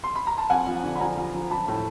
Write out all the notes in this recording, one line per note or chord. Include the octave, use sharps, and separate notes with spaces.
C6
B5
A#5
A5
F2 F#5 G#5
F3
D3
B5
F3 G#5 A#5
F3
F3
F3 A5 B5
A2